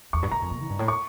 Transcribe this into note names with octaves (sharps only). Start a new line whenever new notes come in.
E2 C#6
G2
A2 A#5
F2
A#2
E3
G2
A2
C#6